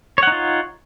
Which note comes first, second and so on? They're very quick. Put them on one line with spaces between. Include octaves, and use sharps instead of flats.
C#5 F#5 D#4 F4